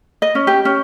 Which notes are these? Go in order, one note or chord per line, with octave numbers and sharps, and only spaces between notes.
D#5
C#4
G4
C#4